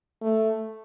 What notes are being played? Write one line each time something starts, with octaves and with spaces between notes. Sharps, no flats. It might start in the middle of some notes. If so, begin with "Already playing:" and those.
A3